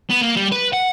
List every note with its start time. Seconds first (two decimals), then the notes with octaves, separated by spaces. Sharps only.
0.10 B3
0.22 A#3
0.37 G3
0.52 B4
0.73 F#5